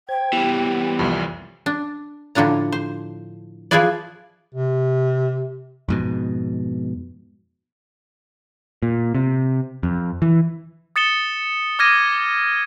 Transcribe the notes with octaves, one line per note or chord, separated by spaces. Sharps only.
C5 G5 G#6
E3 G3 B3 G4
C2 F2
D4
A2 D3 F3 D4 A#5
C5
F3 E4 F4 G#4 B4 D5
C3
F2 G#2 B2
A#2
C3
F2
E3
D#6 A6 C#7 E7 G7
D6 F6 G#6 A#6 D#7